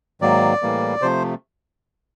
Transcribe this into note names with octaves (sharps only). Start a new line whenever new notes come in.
G#2 D#3 F#3 A#3 D5
A2 E3 G3 A#3
C3 F3 A3 C5